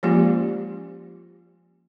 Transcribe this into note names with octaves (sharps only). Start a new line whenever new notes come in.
F3 G#3 A#3 C#4 F4 G4